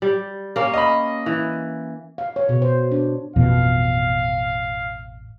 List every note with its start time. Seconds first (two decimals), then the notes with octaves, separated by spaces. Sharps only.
0.02 G3
0.56 A#3 C#4
0.74 D#5 B5
1.26 E3
2.18 F5
2.36 C#5
2.49 B2
2.62 C5
2.92 D4
3.36 A1 F2 B2 F5